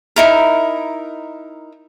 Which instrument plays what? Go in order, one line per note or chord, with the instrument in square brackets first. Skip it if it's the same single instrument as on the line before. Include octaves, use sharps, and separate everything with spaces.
[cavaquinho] D#4 E4 A#4